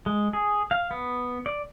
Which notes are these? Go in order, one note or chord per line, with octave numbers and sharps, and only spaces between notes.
G#3
G#4
F5
B3
D5